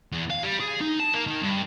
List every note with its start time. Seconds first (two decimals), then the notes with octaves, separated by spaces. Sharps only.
0.13 E2
0.30 F5
0.43 G3
0.60 G#4
0.81 D#4
1.00 A5
1.14 A#3
1.27 D#3
1.42 G2